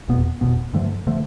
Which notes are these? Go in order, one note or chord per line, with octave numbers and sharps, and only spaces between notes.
F1 E2 B2 B3
F1 E2 B2 B3
G2 D3 F3 A3
D3 F3 A3